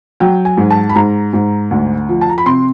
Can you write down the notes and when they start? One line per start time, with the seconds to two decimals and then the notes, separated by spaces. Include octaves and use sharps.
0.20 F#3 G5
0.45 G#5
0.57 G#2
0.70 A5
0.89 B5
0.95 G#2 A#5
1.33 G#2
1.71 D2
2.09 F3
2.21 A5
2.29 A#5
2.38 B5
2.46 C3 C6